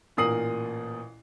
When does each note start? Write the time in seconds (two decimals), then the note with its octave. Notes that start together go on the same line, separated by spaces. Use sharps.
0.17 A1 A#2 A#4 D#6 C7 F#7